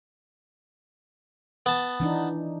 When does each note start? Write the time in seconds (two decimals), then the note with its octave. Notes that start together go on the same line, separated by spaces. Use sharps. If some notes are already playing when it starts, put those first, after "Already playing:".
1.66 B3 A5
2.00 E3 D4 D#4